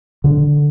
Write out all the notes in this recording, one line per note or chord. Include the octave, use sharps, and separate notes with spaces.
D3